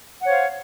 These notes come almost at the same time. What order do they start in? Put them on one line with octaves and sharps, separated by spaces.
F#5 C#5 C5 F5